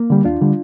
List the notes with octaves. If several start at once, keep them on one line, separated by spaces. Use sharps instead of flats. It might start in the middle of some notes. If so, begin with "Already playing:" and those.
Already playing: A#3
D3 G3
D#2 D4 F4
D3 G3